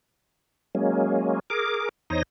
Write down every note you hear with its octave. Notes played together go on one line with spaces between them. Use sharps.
F#3 G#3 A#3 C#4
G#4 A#4 D6
E2 D#4 C5 C#5 D#6 A#6